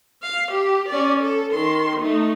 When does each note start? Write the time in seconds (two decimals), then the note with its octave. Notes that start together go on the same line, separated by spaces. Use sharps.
0.22 F5
0.52 G4
0.89 C#4 D5
1.20 A4
1.53 D#3 C6
2.01 A3 D#4